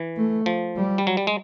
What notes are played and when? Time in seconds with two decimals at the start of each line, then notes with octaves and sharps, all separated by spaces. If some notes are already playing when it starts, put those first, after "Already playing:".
Already playing: E3
0.17 A3
0.46 F3
0.76 G3
0.98 G3
1.07 F#3
1.17 G3
1.27 G#3